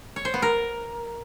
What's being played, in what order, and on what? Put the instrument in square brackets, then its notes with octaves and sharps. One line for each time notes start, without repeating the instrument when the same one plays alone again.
[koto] C#5
C5
B3
A#4